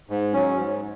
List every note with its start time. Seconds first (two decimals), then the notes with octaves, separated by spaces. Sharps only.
0.10 G#2
0.33 F#3 C#4
0.57 G#2